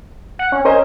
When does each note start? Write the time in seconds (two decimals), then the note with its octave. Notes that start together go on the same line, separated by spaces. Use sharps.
0.39 F#5
0.52 C#4
0.65 C#4 A#4 C5 D#5